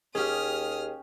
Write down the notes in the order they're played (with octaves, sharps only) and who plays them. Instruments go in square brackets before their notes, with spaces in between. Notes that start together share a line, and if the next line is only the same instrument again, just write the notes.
[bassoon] D#2 [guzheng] C#4 G4 [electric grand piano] G#4 [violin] D#6 F6